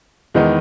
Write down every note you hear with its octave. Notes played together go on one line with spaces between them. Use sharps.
E2 D#3 G#3 B3 D#4